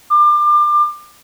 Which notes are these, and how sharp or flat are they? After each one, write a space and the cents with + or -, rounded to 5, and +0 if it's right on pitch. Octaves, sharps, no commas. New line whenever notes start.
D6 +30